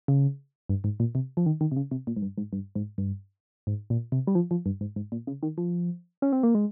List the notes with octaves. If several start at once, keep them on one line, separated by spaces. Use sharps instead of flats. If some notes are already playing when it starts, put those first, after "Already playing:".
C#3
G2
G#2
A#2
C3
F3
D#3
D#3
C3
C#3
C3
A#2
G#2
G2
G#2
G2
G#2
G2
G#2
A#2
C3
G3
F3
F3
G2
G#2
G#2
A#2
C#3
D#3
F3
C#4
C4
A#3
G#3